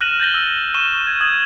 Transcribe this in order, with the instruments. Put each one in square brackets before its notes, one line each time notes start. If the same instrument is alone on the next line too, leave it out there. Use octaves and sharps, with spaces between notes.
[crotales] F6 F#6 A#6 D#7 E7 F#7
G6 A6 A#6 G7
E6
C#6 D#7 E7 G7
G#6
D#6 G#6 F#7